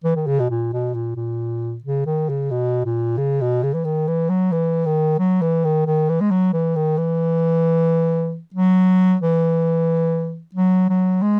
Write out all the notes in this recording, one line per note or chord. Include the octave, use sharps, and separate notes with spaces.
E3
D#3
C#3
B2
A#2
B2
A#2
A#2
C#3
D#3
C#3
B2
A#2
C#3
B2
C#3
E3
D#3
E3
F#3
E3
D#3
F#3
E3
D#3
D#3
E3
G#3
F#3
E3
D#3
E3
F#3
E3
F#3
F#3
G#3